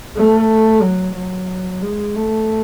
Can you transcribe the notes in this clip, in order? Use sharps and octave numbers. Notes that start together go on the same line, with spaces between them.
A3
F#3
F#3
G#3
A3